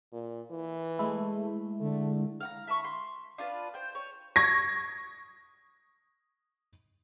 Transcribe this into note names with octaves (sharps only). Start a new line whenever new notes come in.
A#2
E3
G#3 A3 E4
D3 A3
F5 F#5 A#5
E5 A5 B5 C#6
C6
D4 F4 B4 A5
C5 G5
C#5
C#6 G#6 A#6